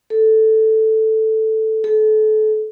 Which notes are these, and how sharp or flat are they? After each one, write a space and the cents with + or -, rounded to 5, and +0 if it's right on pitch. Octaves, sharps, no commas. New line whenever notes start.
A4 +0
A4 -30